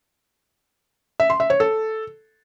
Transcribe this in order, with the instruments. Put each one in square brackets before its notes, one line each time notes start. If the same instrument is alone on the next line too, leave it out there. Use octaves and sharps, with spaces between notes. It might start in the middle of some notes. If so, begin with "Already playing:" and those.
[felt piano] E5
C6
E5
C#5
A4